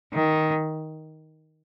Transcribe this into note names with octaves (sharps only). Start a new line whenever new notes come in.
D#3